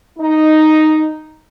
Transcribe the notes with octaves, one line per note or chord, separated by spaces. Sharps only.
D#4